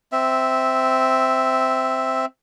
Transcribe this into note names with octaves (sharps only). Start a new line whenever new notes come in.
C4 E5